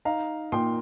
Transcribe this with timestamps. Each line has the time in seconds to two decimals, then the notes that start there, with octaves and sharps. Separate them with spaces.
0.05 D#4 F5 A#5
0.52 A#2 G5 C6